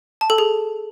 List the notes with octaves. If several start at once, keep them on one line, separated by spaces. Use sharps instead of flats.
A5
A4
G#4